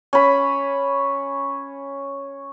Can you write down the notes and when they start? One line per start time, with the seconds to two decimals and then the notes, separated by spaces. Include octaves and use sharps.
0.13 C#4 B5